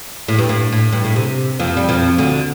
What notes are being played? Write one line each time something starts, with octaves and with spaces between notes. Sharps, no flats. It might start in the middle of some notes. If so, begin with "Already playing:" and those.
A2
G2
A2
A2
G2
A2
C3
F2 F3
G3
F2 F3
D2 D3